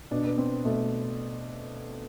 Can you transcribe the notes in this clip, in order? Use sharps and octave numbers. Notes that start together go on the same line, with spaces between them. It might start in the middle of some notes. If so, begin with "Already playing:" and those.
B2 D4
B3
C4
B2 A3